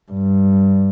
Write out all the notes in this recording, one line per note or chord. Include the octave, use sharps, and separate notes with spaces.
G2